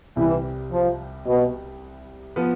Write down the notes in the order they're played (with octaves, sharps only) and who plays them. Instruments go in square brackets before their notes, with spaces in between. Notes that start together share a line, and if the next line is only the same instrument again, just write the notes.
[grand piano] C2 C3 G3 [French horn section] E3
[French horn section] F3
B2
[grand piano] F3 B3